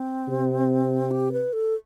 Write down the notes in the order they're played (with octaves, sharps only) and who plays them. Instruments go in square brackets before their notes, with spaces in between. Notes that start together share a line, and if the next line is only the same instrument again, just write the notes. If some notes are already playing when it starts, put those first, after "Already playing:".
Already playing: [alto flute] C4
[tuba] C3
[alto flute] G4
B4
A4